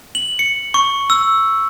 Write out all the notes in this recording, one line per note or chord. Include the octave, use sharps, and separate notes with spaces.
F#7
C#7
C#6
E6